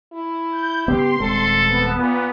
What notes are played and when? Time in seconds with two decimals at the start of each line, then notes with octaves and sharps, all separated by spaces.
0.13 E4
0.52 G6
0.88 G2 C#3 B3 G4 C6
1.20 D#1 G#3 C4 A4
1.67 B3
1.98 A#2